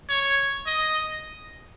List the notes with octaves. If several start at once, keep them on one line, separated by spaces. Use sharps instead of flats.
C#5
D#5